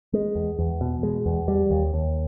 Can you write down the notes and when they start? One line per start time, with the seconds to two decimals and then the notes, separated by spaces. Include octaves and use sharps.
0.13 G#3
0.35 E2
0.59 E2
0.81 B2
1.03 G#3
1.26 E2
1.48 G3
1.71 D#2
1.94 D#2